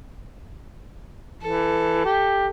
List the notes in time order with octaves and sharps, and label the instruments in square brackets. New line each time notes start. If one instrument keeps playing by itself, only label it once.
[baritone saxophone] E3 [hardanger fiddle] A4
[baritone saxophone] G4